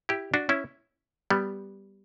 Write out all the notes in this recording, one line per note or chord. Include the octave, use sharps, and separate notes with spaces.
E4 G4
D4 F#4
C#4 E4
G3 B3